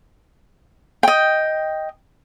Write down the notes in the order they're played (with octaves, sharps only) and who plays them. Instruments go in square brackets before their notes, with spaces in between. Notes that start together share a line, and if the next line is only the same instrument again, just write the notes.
[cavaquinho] D#5 G5